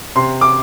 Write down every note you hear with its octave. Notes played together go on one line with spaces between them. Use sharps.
C3 C6
D6